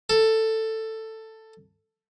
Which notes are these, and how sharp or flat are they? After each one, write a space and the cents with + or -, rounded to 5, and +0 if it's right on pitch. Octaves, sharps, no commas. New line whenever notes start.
A4 +10